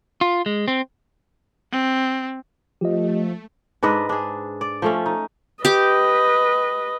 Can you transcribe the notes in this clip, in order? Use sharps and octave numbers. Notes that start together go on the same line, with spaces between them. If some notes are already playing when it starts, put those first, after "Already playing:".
F4
G#3
C4
C4
F3 A3 G4 D#5
G#2 D4 B4 D#5
D4 G#4
D5
F3 A3 C#4
D#4
G4 B4 D#5 D6